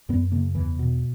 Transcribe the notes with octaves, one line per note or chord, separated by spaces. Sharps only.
F#2 B3
C#3 A#3
E2 E3
B2